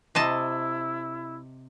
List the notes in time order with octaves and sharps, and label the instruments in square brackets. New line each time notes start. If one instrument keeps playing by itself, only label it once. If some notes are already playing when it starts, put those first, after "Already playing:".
[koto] C3 D#5 A5 [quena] E4